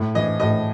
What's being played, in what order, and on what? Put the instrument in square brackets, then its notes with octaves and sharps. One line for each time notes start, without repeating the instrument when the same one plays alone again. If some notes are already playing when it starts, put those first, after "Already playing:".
Already playing: [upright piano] A2
E3 D#5
A2 D#5